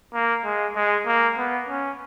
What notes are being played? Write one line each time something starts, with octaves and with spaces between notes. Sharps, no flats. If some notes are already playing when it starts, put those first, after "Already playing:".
A#3
G#3
G#3
A#3
B3
C#4